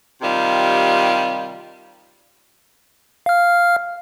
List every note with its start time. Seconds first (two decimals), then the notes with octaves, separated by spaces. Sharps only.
0.22 C3 D#3 G3 F4
3.26 F5 F6